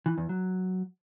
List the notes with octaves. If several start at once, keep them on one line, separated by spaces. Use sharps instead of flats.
E3
E2
F#3